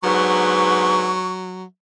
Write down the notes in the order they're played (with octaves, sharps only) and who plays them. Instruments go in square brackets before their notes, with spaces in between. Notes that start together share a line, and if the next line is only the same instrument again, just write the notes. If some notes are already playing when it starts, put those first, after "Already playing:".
[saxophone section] G#2 D3 B3 [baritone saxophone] F#3 [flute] C#6